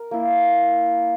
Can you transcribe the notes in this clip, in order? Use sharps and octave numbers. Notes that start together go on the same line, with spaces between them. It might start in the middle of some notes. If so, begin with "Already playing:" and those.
Already playing: A#4
A#3 E4